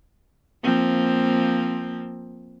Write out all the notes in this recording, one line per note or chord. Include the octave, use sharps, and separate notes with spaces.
F3 A#3 C4